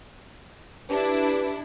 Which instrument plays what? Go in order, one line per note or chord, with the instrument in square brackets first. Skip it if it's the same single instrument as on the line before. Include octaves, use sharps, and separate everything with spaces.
[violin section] D4 E4 [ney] G4 [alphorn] B4